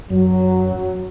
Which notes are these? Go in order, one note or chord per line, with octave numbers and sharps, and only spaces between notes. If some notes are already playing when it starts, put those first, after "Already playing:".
F#2 F#3